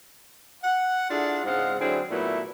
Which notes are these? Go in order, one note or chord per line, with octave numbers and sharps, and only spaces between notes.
F#5
D4 E4 F4 G#4 A4 F#5
G#2 C#3 G#3 C4 F5 F#5
D3 F#3 C4 D4 E4 G#4
A#2 F#3 A3 B3 E4